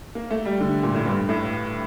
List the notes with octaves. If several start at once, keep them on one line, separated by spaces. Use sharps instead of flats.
A#3
A3
G3
D3
A#2
A2
G2
A2